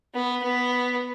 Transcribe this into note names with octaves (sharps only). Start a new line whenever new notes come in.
B3
B3